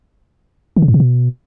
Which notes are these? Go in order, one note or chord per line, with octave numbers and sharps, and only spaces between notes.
D#3
C#3
G#2
C3
B2